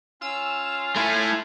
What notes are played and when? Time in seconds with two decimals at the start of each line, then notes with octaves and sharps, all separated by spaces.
0.22 C#4 F4 E6 F6
0.96 A3 E4 G#5